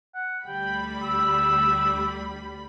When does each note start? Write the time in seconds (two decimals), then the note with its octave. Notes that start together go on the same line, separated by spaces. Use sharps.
0.14 F#5
0.47 D2 G3 G5 B5
1.03 E6